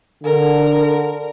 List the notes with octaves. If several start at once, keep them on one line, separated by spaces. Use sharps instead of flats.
D3 A#4